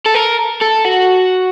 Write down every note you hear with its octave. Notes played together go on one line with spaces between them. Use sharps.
A4
A#4
A4
F#4